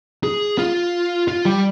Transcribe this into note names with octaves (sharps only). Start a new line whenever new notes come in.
G#4
F4
F4
G3